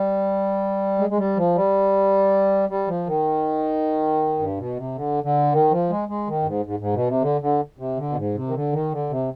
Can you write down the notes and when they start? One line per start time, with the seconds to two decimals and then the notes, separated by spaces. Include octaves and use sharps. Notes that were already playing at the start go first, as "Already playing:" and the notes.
Already playing: G3
0.99 G#3
1.10 G#3
1.18 G3
1.37 F3
1.55 G3
2.69 G3
2.88 F3
3.07 D#3
4.39 G2
4.58 B2
4.77 C3
4.95 D3
5.24 D3
5.52 D#3
5.71 F3
5.90 G#3
6.08 G#3
6.27 D#3
6.42 G2
6.47 G#2
6.65 G#2
6.80 G#2
6.94 B2
7.08 C3
7.22 D3
7.41 D3
7.78 C3
7.97 D3
8.10 B2
8.16 G#2
8.35 C3
8.48 D#3
8.54 D3
8.73 D#3
8.92 D3
9.10 C3